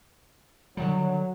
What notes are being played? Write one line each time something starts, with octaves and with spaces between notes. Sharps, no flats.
D3 D#3 F#3 G3